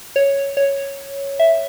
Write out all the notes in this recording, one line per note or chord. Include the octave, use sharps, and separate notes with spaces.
C#5
C#5
E5